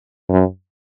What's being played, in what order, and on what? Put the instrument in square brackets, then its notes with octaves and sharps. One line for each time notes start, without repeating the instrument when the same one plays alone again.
[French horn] F#2